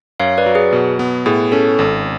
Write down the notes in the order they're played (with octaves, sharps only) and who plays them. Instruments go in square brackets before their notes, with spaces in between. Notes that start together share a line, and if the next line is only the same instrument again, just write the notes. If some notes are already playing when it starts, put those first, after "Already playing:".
[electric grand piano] F#2 [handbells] C#5 F5
[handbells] B4 D5
[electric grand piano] F#3
[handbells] G#4 B4
[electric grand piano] B2
B3
[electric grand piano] A2 [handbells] G#4
[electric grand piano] C#4 [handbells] A4
[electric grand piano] G#1